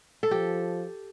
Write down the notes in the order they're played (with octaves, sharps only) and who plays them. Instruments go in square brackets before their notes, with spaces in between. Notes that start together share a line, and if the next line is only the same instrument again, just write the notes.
[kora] A4
[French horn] F3 [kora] G4